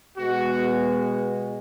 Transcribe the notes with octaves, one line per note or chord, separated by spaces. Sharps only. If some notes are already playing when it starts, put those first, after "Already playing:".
B2 G#3 B3 F#4